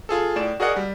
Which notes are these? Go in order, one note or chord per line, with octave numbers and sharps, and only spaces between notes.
F4 G#4 A4
A2 D5 E7
F#4 G#4 A#4 D5 D#5 F#5
G3